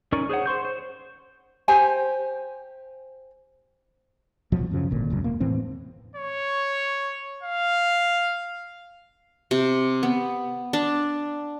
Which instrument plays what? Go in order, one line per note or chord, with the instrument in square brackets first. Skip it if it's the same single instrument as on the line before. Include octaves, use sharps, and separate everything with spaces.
[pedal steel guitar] C#4 D#4 A#4 D5 C#6
G#4 C5 C#5 F#5
C5 C6 C#6 G6
C5
[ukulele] G4 C5 G#5
[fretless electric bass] D#2 B2 F3 F#3
F#2 C#3 F3
D#1 G#1 A#2 D3
E1 C#2 F#2
E1 A#3
E1 A2 E3 C4
[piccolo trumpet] C#5
F5
[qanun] C3
B3
D4